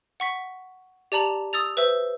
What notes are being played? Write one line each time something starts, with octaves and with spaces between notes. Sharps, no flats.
F#5 C#6 B6
G4 D5 A5 A#5 F#7
D#6 E6 A6 F7
B4 C5 E5 E6